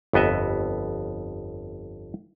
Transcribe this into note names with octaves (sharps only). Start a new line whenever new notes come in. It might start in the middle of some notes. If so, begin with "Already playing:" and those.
G1 F2 B3 D#5 E5